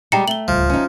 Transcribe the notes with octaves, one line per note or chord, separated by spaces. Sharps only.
G3 G#3 G4 G5 A#5 C#7
A3 F#7 G7
D1 C#2 F3 G3
C#4 D#4